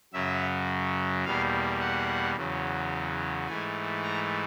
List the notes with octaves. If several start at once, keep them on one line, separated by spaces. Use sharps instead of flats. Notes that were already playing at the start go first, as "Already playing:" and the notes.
F#2 C#3 F#3 E5
E2 B2 G3 A#3 F5
F#5
E2 C#3 F#3
G#2 E3 A3 G#5
A#5